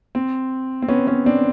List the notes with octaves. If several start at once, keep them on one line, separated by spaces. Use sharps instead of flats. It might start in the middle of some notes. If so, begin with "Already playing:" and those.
C4
C4
B3 C#4
B3 C#4
C4 D4